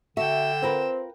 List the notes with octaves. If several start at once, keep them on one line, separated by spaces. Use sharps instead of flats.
D3 F#4 A4 E5 G5 E7
C4 F4 A#4 B4